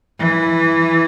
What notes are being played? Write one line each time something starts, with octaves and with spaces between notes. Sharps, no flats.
E3